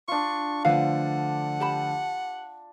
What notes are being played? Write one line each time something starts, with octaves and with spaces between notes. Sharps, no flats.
D4 F4 C#6
D3 F3 A3 B4 F5 F#5
G4 A5 B5